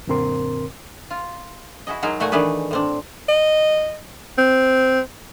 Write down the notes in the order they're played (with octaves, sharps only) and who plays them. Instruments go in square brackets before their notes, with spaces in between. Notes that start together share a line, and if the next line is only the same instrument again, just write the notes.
[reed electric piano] F#2 A#2 D3 C4 A#4 C6
[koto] F4
E4 F#4 G#4 D#5
F#3 G#3 D#4 G#4 A#4
A#2 A3 F#4 F#5 G#5
D#3 E3 A3 D4 G#4 B4
A2 C4 D4
[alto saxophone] D#5
C4